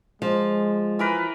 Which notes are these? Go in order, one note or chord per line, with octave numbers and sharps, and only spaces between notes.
F3 G#3
E3 A#4 B4